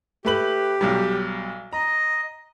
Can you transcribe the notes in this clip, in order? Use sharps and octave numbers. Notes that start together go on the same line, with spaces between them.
A3 G4 B4 F#7
B1 F#3 G3
D#5 A#5